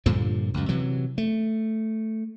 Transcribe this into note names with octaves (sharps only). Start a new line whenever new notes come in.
G2 A#2 D3 F3
C#2 F#2
C3 E3 F#3
A3